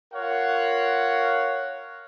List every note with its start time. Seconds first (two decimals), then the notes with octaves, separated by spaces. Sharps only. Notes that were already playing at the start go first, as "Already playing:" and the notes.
0.13 F4 A#4 C#5 F5 F#5